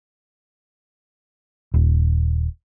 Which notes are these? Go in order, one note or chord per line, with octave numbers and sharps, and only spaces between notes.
D#1